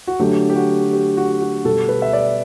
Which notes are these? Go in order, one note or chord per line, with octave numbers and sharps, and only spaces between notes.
F#4
D3 F#3 A3 G4
G4
F#4
G4
F#4
F#4
B2 G3 A4
B4
E5
D5